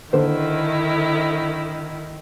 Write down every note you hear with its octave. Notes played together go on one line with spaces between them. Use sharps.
D3 D#3 E4 C5